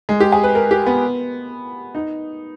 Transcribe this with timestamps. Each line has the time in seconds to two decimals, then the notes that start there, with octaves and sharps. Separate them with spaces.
0.09 G#3
0.20 G4
0.32 G#4
0.44 B4
0.55 A#4
0.71 G4
0.86 B3
1.95 D#4